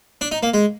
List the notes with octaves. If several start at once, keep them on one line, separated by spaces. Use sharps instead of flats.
D4
D#4
A#3
G#3